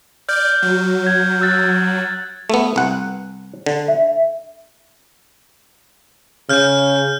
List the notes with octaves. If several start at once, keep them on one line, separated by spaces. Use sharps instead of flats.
D5 F6 G6
F#3
G#6
E6 F#6 A6
A3 B3
C2 F#5
D3
E5
C#3 F6 G6